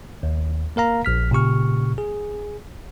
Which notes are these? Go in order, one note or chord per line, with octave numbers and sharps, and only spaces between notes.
D#2
A#3 A#4 F5 A#5
A#1 F6 B6
A#2 C#3 G4 C#6 F6
G#4